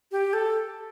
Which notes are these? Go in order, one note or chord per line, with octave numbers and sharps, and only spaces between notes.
G4
A4